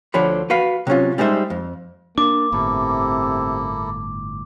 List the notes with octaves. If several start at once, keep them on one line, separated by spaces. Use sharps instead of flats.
D2 D3 F3 C5 C#5 B5
F#4 B4 F5
C3 F#3 C#4 F4
G3 G#3 D#4 C5 E5
F2
A#3 D4 D6
G1 A2 C3 A#3 E4 A4